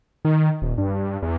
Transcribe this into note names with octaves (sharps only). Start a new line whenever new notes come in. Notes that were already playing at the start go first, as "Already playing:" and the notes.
D#3
D#1
G2
E2